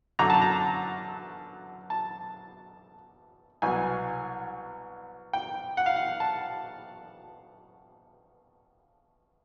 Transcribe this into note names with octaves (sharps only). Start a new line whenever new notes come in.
F#2 D3 F#3 A#5
A5
A#5
A5
C2 B2 F#3 G#5
G5
F#5
F5
F#5
A5